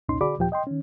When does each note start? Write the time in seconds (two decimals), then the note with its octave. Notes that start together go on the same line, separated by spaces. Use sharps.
0.09 C2 F2 A#2 C#4 D#4 C6
0.21 D3 F#4 G#4 D5 B5 D6
0.39 D#2 A#2 F3 G4 G5
0.52 D#5 G5 C6
0.67 D#3 C#4